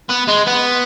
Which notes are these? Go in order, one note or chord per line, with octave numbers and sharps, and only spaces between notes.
B3
G#3
B3